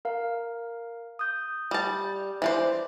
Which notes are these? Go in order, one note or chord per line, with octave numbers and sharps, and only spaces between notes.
A#4 F5
D#6 G6
G3 A5
E3 D4 C5